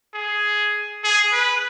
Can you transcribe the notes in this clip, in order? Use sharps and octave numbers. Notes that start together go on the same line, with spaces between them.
G#4
G#4
B4